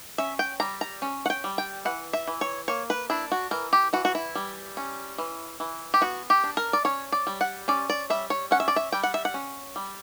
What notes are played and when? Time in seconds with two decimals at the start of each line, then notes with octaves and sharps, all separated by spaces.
0.18 C#4 E5
0.39 G5
0.60 G3 A#5
0.81 A#5
1.02 C#4
1.26 F#5
1.30 G5
1.44 G3
1.58 G5
1.85 E3 F#5
2.13 E5
2.27 E3
2.41 C#5
2.68 A#3 C#5
2.90 B4
3.10 D4 E4
3.32 F#4
3.51 E3 A#4
3.73 G4
3.93 E3 F#4
4.05 F#4
4.15 E4
4.35 G3
4.77 C#4
5.18 E3
5.60 E3
5.94 G4
6.01 B3 F#4
6.30 G4
6.44 D4
6.57 A#4
6.73 D5
6.85 C#4 C#5
7.12 D5
7.27 G3
7.41 F#5
7.68 C#4 D5
7.90 D5
8.10 G3 E5
8.30 C#5
8.51 C#4 F#5
8.60 E5
8.68 D5
8.76 E5
8.92 G3 G5
9.03 F#5
9.14 E5
9.25 F#5
9.34 C#4
9.76 G3